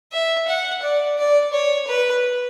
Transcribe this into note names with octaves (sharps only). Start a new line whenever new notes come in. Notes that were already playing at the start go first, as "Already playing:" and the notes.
E5
F#5
D5
D5
C#5
B4